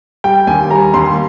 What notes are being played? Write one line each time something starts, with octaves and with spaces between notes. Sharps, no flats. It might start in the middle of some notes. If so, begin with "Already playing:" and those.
G3 G5
D#2 G#5
G3 A#5
D#2 C6